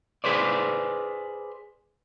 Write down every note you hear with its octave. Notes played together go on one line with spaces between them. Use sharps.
G#4 B4 C5 D5